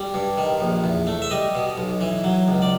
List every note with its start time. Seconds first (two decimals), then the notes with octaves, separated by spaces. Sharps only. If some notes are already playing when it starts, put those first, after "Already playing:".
Already playing: G3
0.14 G2
0.38 D#3
0.60 A#1
0.84 E2
1.07 A3
1.22 E5
1.31 G3 D#5
1.55 B2
1.78 B1
2.01 E3
2.24 F#3
2.48 C#2
2.62 D5